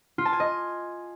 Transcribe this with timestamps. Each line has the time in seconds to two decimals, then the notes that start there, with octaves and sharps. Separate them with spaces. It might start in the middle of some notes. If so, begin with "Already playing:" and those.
0.18 F4
0.25 A5
0.33 G#5
0.40 D#5